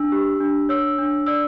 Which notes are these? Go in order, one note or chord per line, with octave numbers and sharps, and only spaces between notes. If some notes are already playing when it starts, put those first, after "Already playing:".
Already playing: D4 E6
G4
D4
C#5 E6
D4
D5 E6